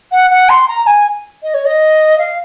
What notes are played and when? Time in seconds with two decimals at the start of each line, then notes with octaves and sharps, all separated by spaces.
0.12 F#5
0.31 F#5
0.49 C6
0.68 A#5
0.87 G#5
1.43 D#5
1.54 C#5
1.65 D#5
2.18 F5